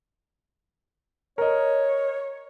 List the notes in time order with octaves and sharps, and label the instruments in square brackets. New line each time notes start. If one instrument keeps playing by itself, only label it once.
[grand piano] A#4 D#5 [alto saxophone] C#5